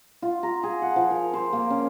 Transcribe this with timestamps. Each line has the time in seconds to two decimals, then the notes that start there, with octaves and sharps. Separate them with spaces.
0.22 F4
0.43 A#5
0.63 G#4
0.82 F#5
0.96 F3
1.11 A#4
1.34 C5
1.53 A#3
1.70 C#4